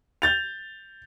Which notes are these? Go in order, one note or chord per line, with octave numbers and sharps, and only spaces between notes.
G6 A6 F7